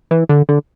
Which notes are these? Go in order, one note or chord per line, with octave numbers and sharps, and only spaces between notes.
E3
D3
D3